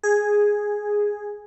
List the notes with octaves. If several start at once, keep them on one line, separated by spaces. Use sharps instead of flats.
G#4